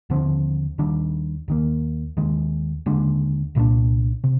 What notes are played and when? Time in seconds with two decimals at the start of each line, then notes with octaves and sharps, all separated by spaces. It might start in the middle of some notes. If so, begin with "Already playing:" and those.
0.10 D#2 D3 F3 C4
0.78 D#2 D#3 G3 D4
1.48 D#2 D#3 A#3
2.17 D#2 D#3 G#3
2.86 D#2 D3 G#3 D4
3.55 C2 A#2 G3 D4
4.24 C3